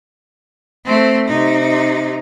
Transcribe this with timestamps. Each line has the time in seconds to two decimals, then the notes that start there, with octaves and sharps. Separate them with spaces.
0.85 A3 C4
1.28 C3 D#4